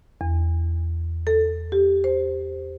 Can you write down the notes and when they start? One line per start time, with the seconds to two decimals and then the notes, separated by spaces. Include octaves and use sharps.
0.21 E2
1.27 A4
1.72 G4
2.04 C5